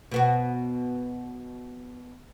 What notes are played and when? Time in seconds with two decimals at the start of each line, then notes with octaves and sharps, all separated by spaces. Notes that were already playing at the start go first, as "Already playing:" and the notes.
0.11 B2 B3 F#4